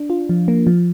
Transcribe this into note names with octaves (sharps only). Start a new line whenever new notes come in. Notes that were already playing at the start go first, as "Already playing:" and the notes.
Already playing: D4
F4
F3
A#3
F3